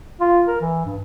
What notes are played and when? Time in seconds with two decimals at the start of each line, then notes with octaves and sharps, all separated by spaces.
0.21 F4
0.48 A#4
0.61 E3
0.85 G2